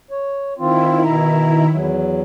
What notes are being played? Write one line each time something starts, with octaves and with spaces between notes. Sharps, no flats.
C#5
D#3 C4 E4 F4
B2 A#5
E2 F#3